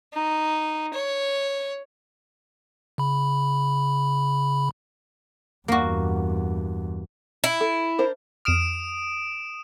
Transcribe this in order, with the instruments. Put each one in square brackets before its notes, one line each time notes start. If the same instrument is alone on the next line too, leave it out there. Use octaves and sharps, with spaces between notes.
[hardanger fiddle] D#4
C#5
[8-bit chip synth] C#3 B5
[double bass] E2 G2 [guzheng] A#3 F#4
[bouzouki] E4
[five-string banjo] A4
D4 A#4 C5
[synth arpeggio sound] F2 F6 [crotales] D#6 D7 E7